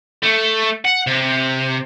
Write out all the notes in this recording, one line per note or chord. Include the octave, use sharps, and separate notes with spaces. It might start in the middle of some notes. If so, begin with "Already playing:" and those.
A3
F#5
C3